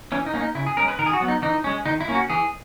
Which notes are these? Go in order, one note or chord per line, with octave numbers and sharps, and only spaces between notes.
E3 C#4
D#4
A#3 C#4
D#4
C#3 E4
G#4
G#3 C#4 A#4
B4
D#3 A#4
G#4
F#4
F#3 B3
D#4
E3 D#4
G#3 C#4
D#3 D#4
E4
A#3 C#4
F#4
E3 G#4